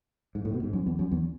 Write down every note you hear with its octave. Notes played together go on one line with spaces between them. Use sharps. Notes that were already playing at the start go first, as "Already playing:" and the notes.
G#2
A2
B2
G#2
F#2
E2
F#2
E2